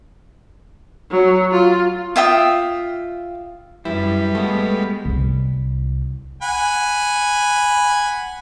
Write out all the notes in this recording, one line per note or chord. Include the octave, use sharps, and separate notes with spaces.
F#3
F4
F4 E5 G5 D#6
F#2 G3 E4 B4
G#3 A3 B3
C2
F#5 G#5 B5